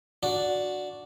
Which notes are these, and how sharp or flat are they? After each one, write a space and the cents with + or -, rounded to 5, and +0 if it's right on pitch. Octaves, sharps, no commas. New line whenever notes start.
D4 -5 F#4 -10